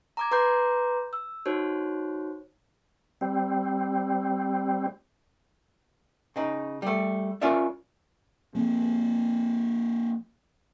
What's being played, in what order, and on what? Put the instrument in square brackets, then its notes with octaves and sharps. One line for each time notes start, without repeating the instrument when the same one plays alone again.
[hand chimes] A#5 D6 G#6
B4 A#5 C6 D6 G6
E6
D#4 F#4 C5 C#5
[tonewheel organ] G3 C4
[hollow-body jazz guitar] C#3 D#4
G3 A3
C#4 F4 A#4 D5 E5
[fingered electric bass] F3 A#3 C4